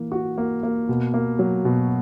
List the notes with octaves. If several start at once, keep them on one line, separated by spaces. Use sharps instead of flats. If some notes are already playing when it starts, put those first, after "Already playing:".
Already playing: E3 A#3
F#4
A#3
A#3
B2
A#3
F#3
B2